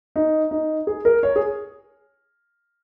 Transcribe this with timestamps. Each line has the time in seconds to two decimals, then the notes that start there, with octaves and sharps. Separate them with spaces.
0.16 D#4
0.51 D#4
0.87 G#4
1.05 A#4
1.23 C#5
1.36 G#4